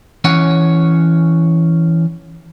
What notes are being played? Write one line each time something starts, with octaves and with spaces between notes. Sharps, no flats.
E3 C#4 C#5 F#5